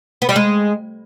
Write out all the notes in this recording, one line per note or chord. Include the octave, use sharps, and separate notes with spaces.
B3
G3
G#3